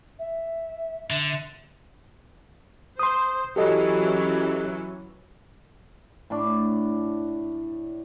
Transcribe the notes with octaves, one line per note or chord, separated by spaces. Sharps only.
E5
D3
C5 C6 D#6
E3 F#3 C#4 G4 A4 D#5
A2 D4